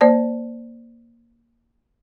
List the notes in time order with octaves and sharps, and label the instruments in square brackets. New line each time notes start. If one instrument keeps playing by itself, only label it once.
[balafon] A#3 C5 D5 A5